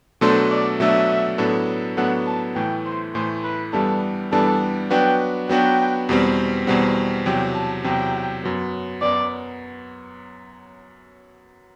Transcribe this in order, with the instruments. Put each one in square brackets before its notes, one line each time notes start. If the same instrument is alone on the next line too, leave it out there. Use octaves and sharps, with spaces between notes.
[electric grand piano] B2 F#3 A3 D4 A4 [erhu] C5
[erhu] D5
[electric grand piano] B2 F#3 A3 D4 A4 [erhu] E5
[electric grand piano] A2 F#3 B3 D4 A4
[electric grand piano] A2 F#3 B3 D4 A4 [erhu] F#5
[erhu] A5
[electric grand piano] A2 E3 A3 [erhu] G5
[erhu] C5
[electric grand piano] A2 E3 A3 [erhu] C5
[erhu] B4
[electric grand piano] G2 E3 G3 B3 D4 [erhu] A4
[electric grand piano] G2 E3 G3 B3 D4 [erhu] A4
[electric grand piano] F#3 B3 D4 F#4 B4 [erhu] G5
[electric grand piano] F#3 B3 D4 F#4 B4 [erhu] G5
[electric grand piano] E2 B2 G3 C4
[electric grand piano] E2 B2 G3 C4 [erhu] F#5
[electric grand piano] E2 C3 F#3 [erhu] G5
[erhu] A5
[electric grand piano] E2 C3 F#3 [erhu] G5
[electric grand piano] F#2 F#3 B3
[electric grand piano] F#2 F#3 B3 [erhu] D5